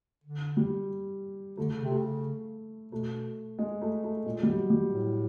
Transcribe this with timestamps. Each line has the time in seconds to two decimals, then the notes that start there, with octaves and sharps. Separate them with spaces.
0.24 D3
0.57 G3
1.57 D3 A3
1.71 C#3
1.83 C3
1.91 A3
1.97 C#3
2.92 B2 A3
3.59 G#3
3.82 A3
4.04 A3
4.25 A#2 G#3
4.43 G3
4.48 F#3
4.70 G3
4.93 A2